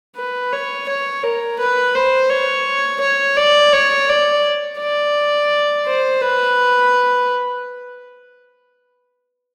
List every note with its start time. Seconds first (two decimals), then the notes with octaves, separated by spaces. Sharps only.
0.16 B4
0.52 C#5
0.88 C#5
1.23 A#4
1.59 B4
1.95 C5
2.30 C#5
3.01 C#5
3.37 D5
3.73 C#5
4.09 D5
4.79 D5
5.86 C5
6.21 B4